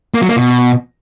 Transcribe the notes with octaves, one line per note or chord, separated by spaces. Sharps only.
A#3
F#3
A#3
B2